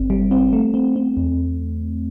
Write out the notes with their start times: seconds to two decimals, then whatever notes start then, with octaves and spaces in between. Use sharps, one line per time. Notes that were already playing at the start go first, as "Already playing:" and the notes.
Already playing: G1 C4
0.10 G3
0.31 C4
0.53 A3
0.74 C4
0.96 C4
1.17 E2